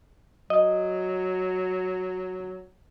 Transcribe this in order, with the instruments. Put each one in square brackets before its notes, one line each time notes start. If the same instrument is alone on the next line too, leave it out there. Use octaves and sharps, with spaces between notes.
[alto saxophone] F#3 [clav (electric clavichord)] D#5